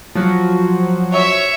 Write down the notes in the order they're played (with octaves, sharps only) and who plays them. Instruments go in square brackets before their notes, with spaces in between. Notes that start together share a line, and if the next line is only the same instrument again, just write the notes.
[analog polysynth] F3 F#3 F#4
[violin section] C#5 E5